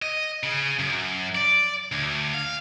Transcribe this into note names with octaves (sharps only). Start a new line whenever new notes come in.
D#5
C#3
F#2
D5
D2
F5